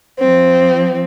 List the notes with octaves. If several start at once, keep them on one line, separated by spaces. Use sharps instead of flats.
F3 C4